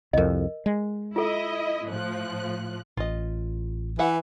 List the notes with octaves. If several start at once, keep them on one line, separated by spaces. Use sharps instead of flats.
C2 F2 A#4 D#5
G#3
E4 F4 A4 D#5
A2 F3 F#6
A1 F4 D#5
E3 B4 E5 F#5